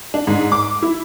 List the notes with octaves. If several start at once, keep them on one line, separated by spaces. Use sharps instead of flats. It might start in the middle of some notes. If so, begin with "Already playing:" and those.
D4
G#2
D6
E4